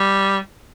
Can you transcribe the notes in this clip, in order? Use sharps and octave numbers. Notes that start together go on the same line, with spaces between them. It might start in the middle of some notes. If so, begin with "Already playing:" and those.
Already playing: G3